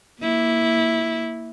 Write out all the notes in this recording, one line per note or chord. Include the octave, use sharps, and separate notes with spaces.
A#3 E4